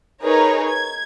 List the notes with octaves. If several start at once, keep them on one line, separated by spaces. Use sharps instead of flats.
D#4 G#4 A#4 B4 C#5 A#5
G#6